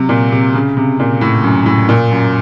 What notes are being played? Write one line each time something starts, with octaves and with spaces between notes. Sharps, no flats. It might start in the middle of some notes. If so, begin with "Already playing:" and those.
Already playing: C3 F#3
A#2
C3
C#3
C3
A#2
A2
F#2
A2
A#2
F#2